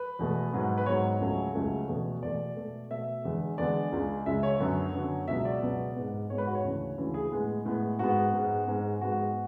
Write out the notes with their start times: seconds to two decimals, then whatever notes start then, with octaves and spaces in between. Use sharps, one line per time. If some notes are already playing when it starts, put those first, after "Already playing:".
Already playing: B4
0.19 E2 B2 A3
0.53 G#2 F#3 B3
0.78 B4
0.86 G#2 F#3 B3 C#5
1.21 C#2 C#3 F#3 A3
1.55 C#2 C#3 F#3 A3
1.88 E2 B2 A3
2.22 E2 B2 A3 D5
2.57 B2 A3
2.90 B2 A3 E5
3.25 E2 D3 G#3 B3
3.58 E2 D3 G#3 B3 D5
3.92 C#2 C#3 G#3
4.26 C#2 C#3 G#3 E5
4.43 C#5
4.60 F#2 D3 F#3 B3
4.94 F#2 D3 F#3 B3
5.28 C#2 B2 F#3 B3 E5
5.45 D5
5.62 C#2 B2 F#3 B3
5.96 G#2 G#3 B3
6.30 G#2 G#3 B3 C#5
6.38 B4
6.47 F#4
6.55 C#5
6.64 D2 C#3 E3
6.98 D2 C#3 E3
7.14 G#4
7.32 A2 G#3 B3
7.66 A2 G#3 B3
7.99 G#2 G#3 B3 F#4
8.33 G#2 G#3 B3
8.67 G#2 G#3 B3
9.01 G#2 G#3 B3 F#4